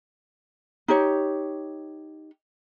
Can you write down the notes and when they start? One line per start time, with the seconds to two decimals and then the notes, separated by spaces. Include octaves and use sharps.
0.88 D#4 G4 C#5